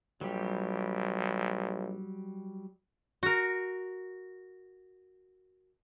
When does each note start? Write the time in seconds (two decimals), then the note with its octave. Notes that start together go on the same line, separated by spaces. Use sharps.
0.21 A#1 F#3 G3 G4
3.23 F#4 A#4